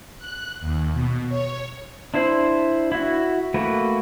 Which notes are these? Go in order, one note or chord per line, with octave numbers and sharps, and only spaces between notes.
F#6
D#2
B2
C#5
D4 E4 C5
E4 F#4
A3 A#3 F#4 B4